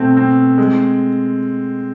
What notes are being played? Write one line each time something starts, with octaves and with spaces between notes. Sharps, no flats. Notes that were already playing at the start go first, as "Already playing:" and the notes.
Already playing: B2 A3 C4
C4
G#3